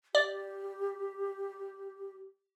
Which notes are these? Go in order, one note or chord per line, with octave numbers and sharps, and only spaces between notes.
G4 D5